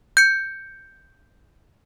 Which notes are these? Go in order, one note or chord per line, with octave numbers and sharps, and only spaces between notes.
G6 C#7